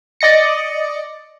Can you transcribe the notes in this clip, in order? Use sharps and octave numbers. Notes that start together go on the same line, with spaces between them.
D5 D#5 A#6 C#7